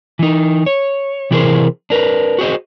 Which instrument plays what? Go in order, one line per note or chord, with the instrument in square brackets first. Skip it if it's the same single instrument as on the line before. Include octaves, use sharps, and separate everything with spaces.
[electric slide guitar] E3 D#4
C#5
C3 E3 E4 G#4 A#4 C5
D4 A#4 B4
F#4 G#4 C5 D#5